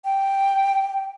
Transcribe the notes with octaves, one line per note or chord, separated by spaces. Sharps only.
G5